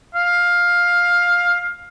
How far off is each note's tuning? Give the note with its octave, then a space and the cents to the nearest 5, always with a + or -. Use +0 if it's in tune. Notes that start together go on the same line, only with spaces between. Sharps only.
F5 +10